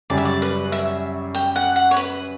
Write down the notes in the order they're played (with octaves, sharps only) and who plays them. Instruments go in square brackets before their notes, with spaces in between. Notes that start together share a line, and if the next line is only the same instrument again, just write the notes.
[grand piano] F#2 C#3 G3 C#4 G4 [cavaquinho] D5
[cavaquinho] E5
D5
B4
E5
G5
F#5
F#5
C#5
B4